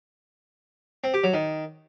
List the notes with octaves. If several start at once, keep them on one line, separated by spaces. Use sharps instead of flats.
C4
G4
F#3
D#3